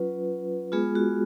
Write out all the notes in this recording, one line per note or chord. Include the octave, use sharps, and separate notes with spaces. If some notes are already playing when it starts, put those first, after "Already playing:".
Already playing: F#3 C#4 F4 B4
G#3 B3 F4 G#4
F#4